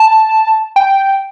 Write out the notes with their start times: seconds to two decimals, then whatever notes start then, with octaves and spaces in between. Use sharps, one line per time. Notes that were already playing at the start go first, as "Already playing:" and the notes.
Already playing: A5
0.76 G5